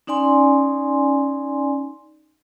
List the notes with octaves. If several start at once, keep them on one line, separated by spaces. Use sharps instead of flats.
C#4 D#4 D5 G#5 C6